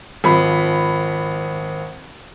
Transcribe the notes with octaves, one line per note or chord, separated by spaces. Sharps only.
G#1 F3 B5